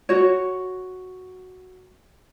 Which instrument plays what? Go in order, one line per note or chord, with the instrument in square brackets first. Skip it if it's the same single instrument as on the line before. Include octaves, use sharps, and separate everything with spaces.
[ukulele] F#4 C#5